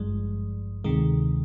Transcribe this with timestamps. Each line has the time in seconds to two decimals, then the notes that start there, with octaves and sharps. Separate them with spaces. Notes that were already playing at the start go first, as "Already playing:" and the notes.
Already playing: G#1 G2 F3 G#3
0.84 D2 C3 D#3 G#3